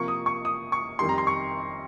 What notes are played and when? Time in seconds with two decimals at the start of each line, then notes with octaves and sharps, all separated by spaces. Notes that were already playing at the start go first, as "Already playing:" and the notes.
Already playing: C3 F3 A#3 C#6
0.08 D#6
0.26 C#6
0.45 D#6
0.72 C#6
0.99 F2 D#3 G3 C6
1.09 A#5
1.18 C6
1.27 C#6